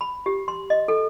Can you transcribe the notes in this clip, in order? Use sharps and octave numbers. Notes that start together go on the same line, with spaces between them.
B5
G4
C6
D#5
A4